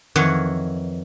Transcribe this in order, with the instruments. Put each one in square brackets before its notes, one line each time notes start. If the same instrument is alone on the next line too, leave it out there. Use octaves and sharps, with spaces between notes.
[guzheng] F2 D#3 E3 C#5 F#5